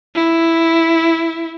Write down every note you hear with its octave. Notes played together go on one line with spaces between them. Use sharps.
E4